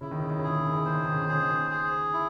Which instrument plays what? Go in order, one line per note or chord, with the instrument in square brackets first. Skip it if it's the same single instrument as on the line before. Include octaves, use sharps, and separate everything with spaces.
[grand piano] C#3 [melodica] E4
[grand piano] D#3
C#3
D#3
C#3
[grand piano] D#3 [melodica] G#4
[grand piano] C#3
D#3
C#3
[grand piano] D#3 [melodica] C5
[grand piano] C#3
D#3
C#3
D#3
[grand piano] C#3 [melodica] G#4
[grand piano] D#3
C#3
[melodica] G#4
E4